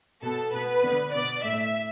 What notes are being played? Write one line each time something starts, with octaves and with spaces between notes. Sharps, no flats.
B2 B3 A4
B2 B3 B4
D3 B3
B2 B3 D5
A2 A3 E5